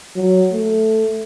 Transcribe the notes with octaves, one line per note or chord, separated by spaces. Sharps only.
F#3
A3